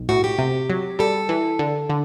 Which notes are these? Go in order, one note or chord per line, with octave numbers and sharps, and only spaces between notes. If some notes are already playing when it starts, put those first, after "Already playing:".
Already playing: B1
A2 F#4
G4
C3
F#3
G3 A4
E3
D3
D3